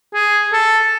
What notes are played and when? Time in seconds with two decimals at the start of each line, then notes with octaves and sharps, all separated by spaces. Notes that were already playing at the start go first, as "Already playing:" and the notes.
0.14 G#4
0.52 A4